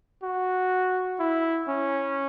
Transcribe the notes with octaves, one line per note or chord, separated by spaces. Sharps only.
F#4
E4
C#4